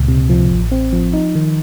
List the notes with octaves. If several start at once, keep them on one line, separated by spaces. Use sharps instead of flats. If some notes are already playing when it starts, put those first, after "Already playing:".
Already playing: C#2 A#2
C3
F3
A1
C4
F3
D#4
D#3